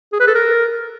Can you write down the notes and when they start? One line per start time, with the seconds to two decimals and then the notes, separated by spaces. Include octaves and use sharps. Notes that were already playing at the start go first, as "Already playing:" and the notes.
0.13 G#4
0.20 B4
0.27 A4
0.35 A#4